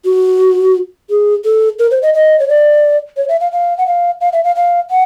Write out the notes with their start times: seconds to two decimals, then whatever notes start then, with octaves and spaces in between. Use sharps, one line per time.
0.05 F#4
1.10 G#4
1.45 A4
1.79 A#4
1.91 C5
2.02 D#5
2.14 D#5
2.39 C#5
2.48 D5
3.17 C#5
3.28 E5
3.40 F5
3.52 F5
3.78 F#5
3.87 F5
4.21 F5
4.33 E5
4.44 F5
4.56 F5
4.90 F#5